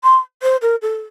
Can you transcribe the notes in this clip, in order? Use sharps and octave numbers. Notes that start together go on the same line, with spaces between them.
C6
C5
A#4
A4